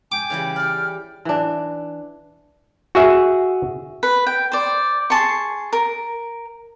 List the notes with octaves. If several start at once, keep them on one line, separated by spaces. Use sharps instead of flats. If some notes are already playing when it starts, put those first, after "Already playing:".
G5 G#5 D6
C#3 E3 G3
G4 D5 F6
E3 D4
F#4 G#4 E5
B4
G5
C5 D5
G#4 A5 C6 C#6
A#4